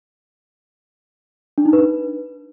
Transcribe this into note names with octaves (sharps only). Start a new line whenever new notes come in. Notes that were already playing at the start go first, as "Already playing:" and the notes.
D4
D#4
B4